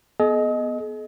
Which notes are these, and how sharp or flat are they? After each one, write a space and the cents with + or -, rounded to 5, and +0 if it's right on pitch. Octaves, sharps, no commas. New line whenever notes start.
B3 +0 G#4 +45 D#5 +0